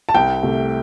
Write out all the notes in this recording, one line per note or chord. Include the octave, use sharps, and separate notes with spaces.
A5
C2 G5
C3 A3